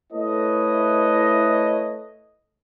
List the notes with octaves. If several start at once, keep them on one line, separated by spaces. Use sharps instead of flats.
A3 E4 A4 B4 C#5 D#5